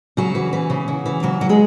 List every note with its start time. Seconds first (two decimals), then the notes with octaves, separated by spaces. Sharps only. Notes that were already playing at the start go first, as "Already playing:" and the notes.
0.17 C#3 F#3 F#4
0.35 E3
0.53 E3
0.70 C#3
0.88 C#3
1.06 E3
1.23 C#3 F#3 F#4
1.41 F#3 F#4
1.49 G#3 G#4